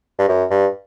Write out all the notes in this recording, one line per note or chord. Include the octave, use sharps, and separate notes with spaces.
G2
F#2
G2